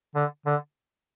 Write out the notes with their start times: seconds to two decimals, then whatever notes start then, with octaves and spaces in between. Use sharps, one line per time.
0.15 D3
0.46 D3